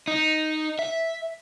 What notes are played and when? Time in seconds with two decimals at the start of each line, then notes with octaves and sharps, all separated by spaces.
0.08 D#4
0.79 E5